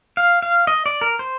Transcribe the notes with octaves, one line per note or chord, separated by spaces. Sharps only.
F5
F5
D#5
D5
A#4
C5